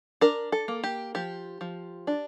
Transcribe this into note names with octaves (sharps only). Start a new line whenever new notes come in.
D4 A#4
A4
A#3
G4
F3 G4
F3
D4